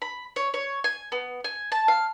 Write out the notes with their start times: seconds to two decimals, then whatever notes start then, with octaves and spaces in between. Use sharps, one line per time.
0.02 B5
0.36 C#5
0.54 C#5
0.84 G#5
1.12 B3
1.44 G#5
1.72 A5
1.88 F5